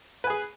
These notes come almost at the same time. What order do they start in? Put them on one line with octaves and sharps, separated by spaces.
B4 G#5 G#4